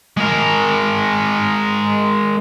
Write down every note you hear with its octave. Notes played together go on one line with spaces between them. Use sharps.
G#3 A#4